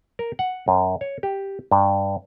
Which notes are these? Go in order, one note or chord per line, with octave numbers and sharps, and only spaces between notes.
A#4
F#5
F#2
C#5
G4
G2